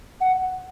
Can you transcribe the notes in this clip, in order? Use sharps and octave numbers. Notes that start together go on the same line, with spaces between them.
F#5